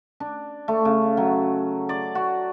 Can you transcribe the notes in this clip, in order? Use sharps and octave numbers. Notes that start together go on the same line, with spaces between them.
D4
A3
C#3
F#3
D5
F#4